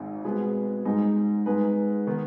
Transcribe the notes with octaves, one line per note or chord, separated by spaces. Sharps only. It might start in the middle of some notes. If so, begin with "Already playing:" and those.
Already playing: G#1 G#2 G#3 D#4
B2 G#3 B3 G#4 B4
G#2 G#3 D#4
G#2 G#3 D#4 G#4 B4
D#3 B3